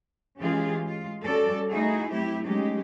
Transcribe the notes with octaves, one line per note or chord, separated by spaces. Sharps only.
E3 G#3 C#4 F4 G4 G#4
G#3 F4
G3 C#4 F#4 A4 D5
A3 D#4 E4 F#4 G#4
F#3 A3 C4 E4 G4
F#3 G#3 A3 C#4 D#4 G4